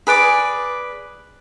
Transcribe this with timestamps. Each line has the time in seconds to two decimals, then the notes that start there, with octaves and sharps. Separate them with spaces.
0.07 G#4 B4 D5 D6